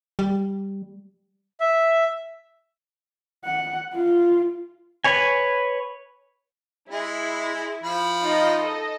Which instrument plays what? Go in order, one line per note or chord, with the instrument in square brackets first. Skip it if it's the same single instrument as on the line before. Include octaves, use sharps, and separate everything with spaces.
[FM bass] G3
[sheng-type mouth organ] E5
[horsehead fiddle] F#5
F4
[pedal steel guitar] B4 C#5 G#5
[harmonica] G#3 [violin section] E4
[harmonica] F3 B5
[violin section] D#4 F4 D#5
A4 D#5